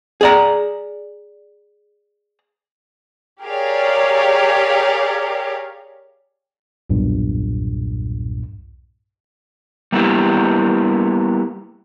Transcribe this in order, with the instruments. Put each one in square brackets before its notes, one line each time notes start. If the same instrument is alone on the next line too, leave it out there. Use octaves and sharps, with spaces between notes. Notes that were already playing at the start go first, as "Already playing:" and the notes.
[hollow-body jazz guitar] G#4 D5 A#5
[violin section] G4 G#4 A#4 C#5 D5 F5
[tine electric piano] B1 E2 G2 A#2
[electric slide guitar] G3 A#3 B3 E4 G4